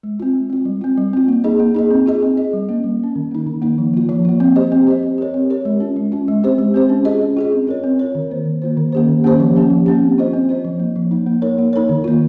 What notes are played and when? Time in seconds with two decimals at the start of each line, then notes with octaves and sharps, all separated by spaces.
0.03 G#3
0.20 C4 F4
0.35 G#3
0.50 C4 F4
0.65 G3
0.81 C4 F4
0.98 G3
1.13 C4 F4
1.28 A#3
1.44 D#4 G#4 D#5
1.60 A#3
1.74 D#4 G#4 D#5
1.91 C4
2.06 F4 G#4 D#5
2.22 C4
2.37 F4 G#4 D#5
2.53 G3
2.69 A#3 C#4
2.84 G3
3.00 A#3 C#4
3.16 D#3
3.31 A#3 D#4
3.47 D#3
3.62 A#3 D#4
3.78 F3
3.93 A#3 F4
4.09 F3
4.25 A#3 F4
4.40 C4
4.56 G4 C5 D#5
4.72 C4
4.87 G4 C5 D#5
5.03 C4
5.18 G4 A#4 C#5
5.34 C4
5.50 G4 A#4 C#5
5.65 G#3
5.80 C#4 F4
5.96 G#3
6.12 C#4 F4
6.28 G#3
6.43 C4 G4 C5
6.59 G#3
6.74 C4 G4 C5
6.89 C#4
7.05 F4 G#4 D#5
7.21 C#4
7.37 F4 G#4 D#5
7.52 C4
7.67 F4 A#4 C#5
7.84 C4
7.99 F4 A#4 C#5
8.15 D#3
8.30 A#3 F4 C5
8.45 D#3
8.62 A#3 F4 C5
8.77 D#3
8.92 A#3 C#4 G4 C5
9.08 D#3
9.24 A#3 C#4 G4 C5
9.40 F3
9.55 A#3 C#4 G4
9.70 F3
9.86 A#3 C#4 G4
10.03 C4
10.18 F4 C5 D#5
10.34 C4
10.49 F4 C5 D#5
10.65 F3
10.79 A#3 D#4
10.96 F3
11.11 A#3 D#4
11.27 A#3
11.42 D#4 A#4 C#5
11.59 A#3
11.73 D#4 A#4 C#5
11.89 D#3
12.04 A#3 F4